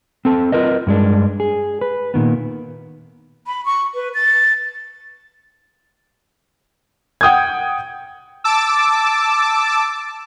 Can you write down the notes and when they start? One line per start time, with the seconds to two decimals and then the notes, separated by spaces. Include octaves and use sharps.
0.25 C4 A4 A5
0.52 F4 A#4 B4 D#5
0.87 G2 G#3 D4
1.40 G#4
1.81 B4
2.14 A#2 D#3 B3
3.46 B5
3.65 C#6
3.94 B4
4.14 A6
7.21 F#5 G5 D#6 G6 G#6
8.44 A5 D6 E6